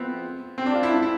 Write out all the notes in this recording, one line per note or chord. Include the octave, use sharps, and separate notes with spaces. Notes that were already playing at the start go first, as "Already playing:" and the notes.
Already playing: F3 B3 C4
C4
D4
F4
E4
D4
E4